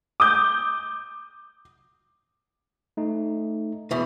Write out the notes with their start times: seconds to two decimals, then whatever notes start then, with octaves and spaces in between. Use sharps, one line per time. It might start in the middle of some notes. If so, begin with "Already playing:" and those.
0.20 D6 D#6 G6
2.97 A3 D#4
3.91 E2 B2 E3